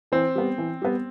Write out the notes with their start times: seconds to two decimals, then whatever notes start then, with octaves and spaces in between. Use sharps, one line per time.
0.12 E3 C4 C5
0.36 G3 B3
0.58 E3
0.82 G3 B3